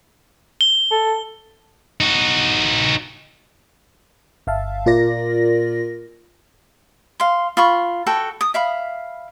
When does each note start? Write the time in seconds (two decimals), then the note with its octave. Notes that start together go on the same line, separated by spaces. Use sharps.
0.61 G7
0.92 A4
2.00 D#4 F#4
4.47 G1 E5 F5 A5
4.86 A#2 F4 A#4 D5 A#6
7.20 F5 C6
7.57 F4 B5 C#6
8.06 F#4 A4 G5
8.41 D#6
8.54 E5 F5 B5